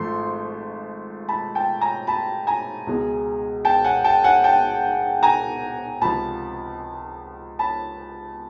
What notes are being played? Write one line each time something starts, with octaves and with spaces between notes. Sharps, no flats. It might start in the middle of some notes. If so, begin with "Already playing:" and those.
Already playing: G#1 G#2 F3 A3 C6
A5 B5
G5 A5
G#5 A#5
A5 B5
G#5 A#5
C#2 B2 G#3
G5 A5
F#5 G#5
G5 A5
F#5 G#5
G5 A5
G#5 A#5
C#2 C3 F3 A5 B5
A5 B5